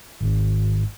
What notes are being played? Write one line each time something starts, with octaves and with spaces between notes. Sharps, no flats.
G#1